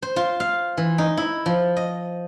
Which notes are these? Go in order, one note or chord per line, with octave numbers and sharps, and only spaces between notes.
C5
F4
F5
E3
D#4
E4
F3
D#5